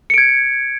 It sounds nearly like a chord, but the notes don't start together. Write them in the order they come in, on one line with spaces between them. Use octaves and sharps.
C#7 D7 G#6